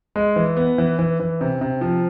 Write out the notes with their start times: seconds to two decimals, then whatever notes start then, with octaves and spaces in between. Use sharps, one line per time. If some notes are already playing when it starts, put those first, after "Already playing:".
0.16 G#3
0.36 E3
0.57 B3
0.78 E3
0.99 E3
1.20 E3
1.41 C3
1.61 C3
1.81 F3